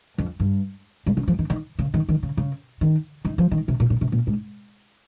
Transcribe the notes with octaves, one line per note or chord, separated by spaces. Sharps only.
F2
G2
G2
C#3
F3
D#3
D#3
C#3
D#3
D#3
C#3
C#3
D#3
D#3
F3
D#3
C3
A#2
A#2
C3
A#2
G#2